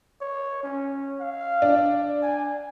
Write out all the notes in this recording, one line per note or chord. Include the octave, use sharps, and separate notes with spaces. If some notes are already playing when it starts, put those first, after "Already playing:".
C#5
C#4
F5
D4
G#5